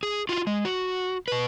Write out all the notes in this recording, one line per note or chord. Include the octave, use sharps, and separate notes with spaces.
G#4
F4 F#4
G#3
F#4
B2 B4